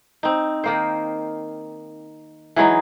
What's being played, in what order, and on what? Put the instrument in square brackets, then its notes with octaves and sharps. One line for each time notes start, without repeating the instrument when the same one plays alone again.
[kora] C4 D#4
D#3 A#3 C5
E3 F#3 G#3 D#4